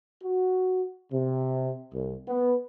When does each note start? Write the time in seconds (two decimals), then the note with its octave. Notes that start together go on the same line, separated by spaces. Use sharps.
0.22 F#4
1.12 C3
1.92 C2
2.26 B3